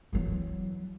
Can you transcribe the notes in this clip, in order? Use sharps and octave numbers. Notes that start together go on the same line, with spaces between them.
E3 F#3